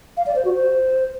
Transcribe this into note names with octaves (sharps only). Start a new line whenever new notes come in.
F5
D5
C5
F#4
C5